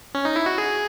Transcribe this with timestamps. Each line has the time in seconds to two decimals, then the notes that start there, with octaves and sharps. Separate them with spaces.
0.15 C#4
0.25 D#4
0.36 E4
0.46 F#4
0.58 G#4